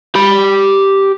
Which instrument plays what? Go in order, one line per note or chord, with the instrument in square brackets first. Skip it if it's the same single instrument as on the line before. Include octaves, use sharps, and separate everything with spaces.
[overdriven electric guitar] G4 B5